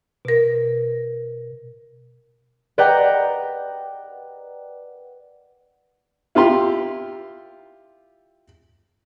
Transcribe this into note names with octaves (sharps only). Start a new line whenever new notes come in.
B2 A#4
B4 D5 D#5 F#5 G5 A#5
E4 F4 G4 C6